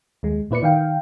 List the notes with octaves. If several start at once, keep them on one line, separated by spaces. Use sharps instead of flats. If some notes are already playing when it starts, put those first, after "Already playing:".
D#2 G#3
A#2 E4 B4 D5 C#7
D#3 F5 G5